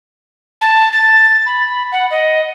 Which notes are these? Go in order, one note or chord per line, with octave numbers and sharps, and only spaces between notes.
A5
A6
B5
F#5
D#5